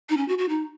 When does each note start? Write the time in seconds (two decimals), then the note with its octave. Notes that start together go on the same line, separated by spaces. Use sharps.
0.09 D#4
0.17 C#4
0.28 F#4
0.38 F#4
0.49 D#4